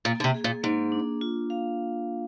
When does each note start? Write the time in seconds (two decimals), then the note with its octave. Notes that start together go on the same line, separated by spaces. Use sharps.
0.05 A#2 A#3
0.20 D3
0.24 C3
0.34 G#4
0.44 A#2
0.63 G#2 A#3
0.92 D4
1.21 F4
1.50 F5